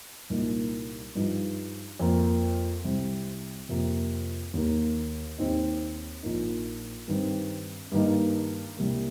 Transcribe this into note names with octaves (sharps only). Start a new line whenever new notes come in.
C2 A#2 A#3 D#4
G2 F3 D#4
F2 F3 A#3
C2 C3 G3 C4
F2 C3 F3 A#3
D#2 D#3 A#3
D#2 D#3 C4 D#4
A#1 A#2 A#3 D#4
G2 D#3 C4
G2 D#3 A#3 D#4
C2 C3 G3 A#3